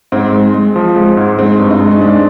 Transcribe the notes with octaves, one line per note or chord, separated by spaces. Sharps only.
G#2 C4
G#3
G#3
F3
G#3
G#2
G#3 C4
G2
D#4
G#3
D#4
G#3 D4